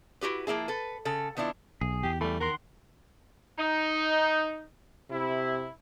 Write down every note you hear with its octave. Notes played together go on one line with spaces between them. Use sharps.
E4 F#4 G4 B4
F3 A#3 E4 G#4
A4 B4
C#3 A4
D#3 B3 D4 E4 F4
B1 G#4
E2 G4
E3 G3 A3
D#3 A#4 F#5 C6
D#4
C3 E4